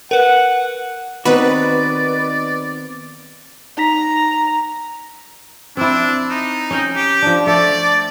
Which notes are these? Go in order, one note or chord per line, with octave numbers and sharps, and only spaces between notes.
A#4 B4 F#5
D#3 B3 C4 D#4 F#4 B4 D5
D#4 A#5 B6
C4 D4 E4
D#4
C#4 G5
G4
F3 D4
A3 D5